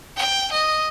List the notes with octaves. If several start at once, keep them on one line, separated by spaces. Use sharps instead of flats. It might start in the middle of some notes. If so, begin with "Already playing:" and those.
G5
D#5